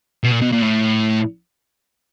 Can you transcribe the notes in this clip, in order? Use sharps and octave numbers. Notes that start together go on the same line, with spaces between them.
B2
A#2
B2
A#2
A2